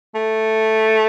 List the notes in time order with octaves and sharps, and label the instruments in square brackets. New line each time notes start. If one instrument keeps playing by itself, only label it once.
[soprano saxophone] A3